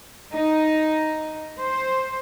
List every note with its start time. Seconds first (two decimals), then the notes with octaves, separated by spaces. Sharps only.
0.32 D#4
1.59 C5